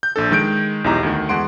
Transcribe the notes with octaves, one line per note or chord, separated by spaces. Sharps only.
G6
A#1 D4 A4
D#3 G#3 G6 D7
B1 E2 E3 D#4 G4 A#5
D2 D#3
E2 G#3 F#5 C6 D7